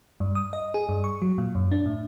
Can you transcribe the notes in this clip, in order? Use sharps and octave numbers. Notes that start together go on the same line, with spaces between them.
G2
D#6
D#5
G#4
G2
C#6
F#3
A#2
F#2
D4
A2